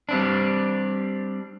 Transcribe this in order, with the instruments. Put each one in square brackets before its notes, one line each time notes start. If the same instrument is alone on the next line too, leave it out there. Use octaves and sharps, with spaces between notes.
[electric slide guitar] G3 C4 D4